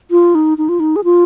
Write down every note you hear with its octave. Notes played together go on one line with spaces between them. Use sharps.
F4
D#4
D#4
F4
D#4
G#4
F4